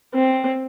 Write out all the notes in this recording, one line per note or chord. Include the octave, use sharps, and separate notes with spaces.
C4